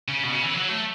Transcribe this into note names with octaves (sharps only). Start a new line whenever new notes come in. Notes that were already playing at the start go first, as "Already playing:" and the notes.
C#3
B2
C#3
E3
F#3
A3